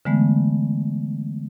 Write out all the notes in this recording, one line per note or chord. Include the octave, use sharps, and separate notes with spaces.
D3 E3 G#3 A3 B3